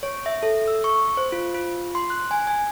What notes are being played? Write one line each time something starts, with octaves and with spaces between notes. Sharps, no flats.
C#5
E5
A4
E6
C#6
C5
F4
F4
C6
F#6
G#5
G#5